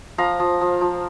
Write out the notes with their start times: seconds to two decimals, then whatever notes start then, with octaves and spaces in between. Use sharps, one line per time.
0.18 F3 F5 A#5
0.40 F3
0.61 F3
0.81 F3